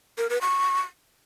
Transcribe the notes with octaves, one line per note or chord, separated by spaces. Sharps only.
A#4
B4
C#6